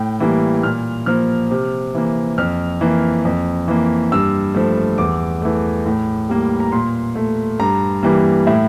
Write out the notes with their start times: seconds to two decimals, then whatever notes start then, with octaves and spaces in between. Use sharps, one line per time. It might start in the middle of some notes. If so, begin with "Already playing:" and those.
Already playing: A2 G5
0.20 E3 G3 A#3
0.63 A#2 F6
1.06 F3 A#3 F6
1.51 C3
1.95 E3 A#3
2.38 F2 F6
2.81 E3 A#3
3.25 F2
3.68 E3 A#3
4.12 G2 E6
4.55 F3 A3
4.98 E2 D6
5.42 E3 A3
5.86 A2
6.29 G3 A#3
6.60 A#5
6.72 A#2 C6
7.15 A3
7.60 G2 A#5
8.03 E3 G3 A#3
8.47 A2 E5